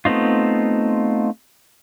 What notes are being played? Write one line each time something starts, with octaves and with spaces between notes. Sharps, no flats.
A3 B3 C4 D#4 F4